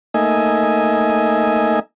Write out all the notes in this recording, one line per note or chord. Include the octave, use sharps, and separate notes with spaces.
A3 A#3 D#4 D#5 E5 G#5